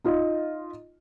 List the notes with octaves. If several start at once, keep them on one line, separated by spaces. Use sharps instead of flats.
D#4 F4 D#5